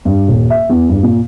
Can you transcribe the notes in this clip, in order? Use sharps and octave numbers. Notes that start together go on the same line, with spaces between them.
G2
D#1
E5
E2
G2
A#2